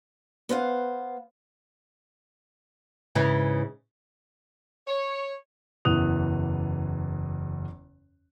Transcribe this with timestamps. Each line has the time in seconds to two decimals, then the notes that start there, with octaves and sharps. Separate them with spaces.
0.49 B3 C5 F5 F#5
3.15 G#2 C#3 E3
4.88 C#5
5.85 F#1 E2 E3 D#6 F#6 F7